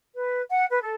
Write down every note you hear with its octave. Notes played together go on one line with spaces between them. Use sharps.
B4
F#5
B4
A4